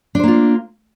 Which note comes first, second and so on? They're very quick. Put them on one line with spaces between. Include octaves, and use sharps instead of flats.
D4 C5 A#3 F4